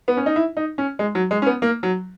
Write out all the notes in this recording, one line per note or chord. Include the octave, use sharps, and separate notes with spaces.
B3
C#4
D#4
E4
D#4
C#4
G#3
F#3
G#3
C#4
B3
A#3
F#3